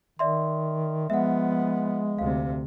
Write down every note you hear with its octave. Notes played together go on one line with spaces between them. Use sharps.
D#3 D5 E5 C6
F3 G#3 B3 E5 F#5
D2 C3 F5